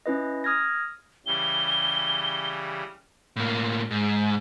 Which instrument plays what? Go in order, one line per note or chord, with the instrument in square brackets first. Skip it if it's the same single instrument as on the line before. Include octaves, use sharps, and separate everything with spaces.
[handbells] C#4 E4 B4 D#5
D#6 F6 G#6 A#6
[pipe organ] C#3 E3 G3 [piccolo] G7
[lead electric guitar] A2 A#3
G#2